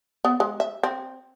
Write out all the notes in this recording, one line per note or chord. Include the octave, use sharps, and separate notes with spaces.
B3
G#3
E5
C4